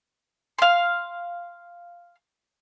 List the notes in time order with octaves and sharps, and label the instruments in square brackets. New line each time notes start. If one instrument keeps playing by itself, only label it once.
[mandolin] F5 C6